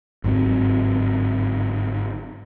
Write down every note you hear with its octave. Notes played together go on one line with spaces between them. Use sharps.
G1 G#2 F#3 C4